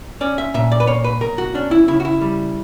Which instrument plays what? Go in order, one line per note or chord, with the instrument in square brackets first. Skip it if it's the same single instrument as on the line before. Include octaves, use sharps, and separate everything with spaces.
[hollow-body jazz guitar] C#4 D5
E5
A#2 E5
D5
B4
A#3 C#5
B4
B1 A#4
F#4
C#4 D4
E4
C#3 E4
F#4
E4
G3